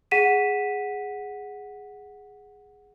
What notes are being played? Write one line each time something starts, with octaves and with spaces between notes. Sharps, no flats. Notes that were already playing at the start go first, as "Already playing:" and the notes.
G#4 F#5 B6 D#7 E7